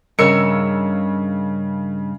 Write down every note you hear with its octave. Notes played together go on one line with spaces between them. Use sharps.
G2 C#3 A#4 C#5 D#5 E6 C#7